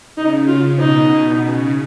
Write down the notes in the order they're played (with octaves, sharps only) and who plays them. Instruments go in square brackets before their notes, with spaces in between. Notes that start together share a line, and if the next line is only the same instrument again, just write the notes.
[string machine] C#3 [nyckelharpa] D#4
[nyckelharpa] F4
[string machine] B2 [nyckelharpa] D#4
[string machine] C#3